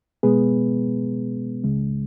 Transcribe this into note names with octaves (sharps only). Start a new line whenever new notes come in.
B2 G#3 B3 G#4 B4
C#2 C#3 G#3